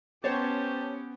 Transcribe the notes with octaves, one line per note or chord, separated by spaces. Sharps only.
B3 C#4 G4 C5 C#5 A5